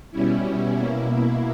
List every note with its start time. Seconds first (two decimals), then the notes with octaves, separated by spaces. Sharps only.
0.11 B2 G3 C#4 E4
0.76 B2 A#3 E4